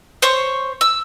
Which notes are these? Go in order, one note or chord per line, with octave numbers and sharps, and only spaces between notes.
C5 C#5 C#6
E6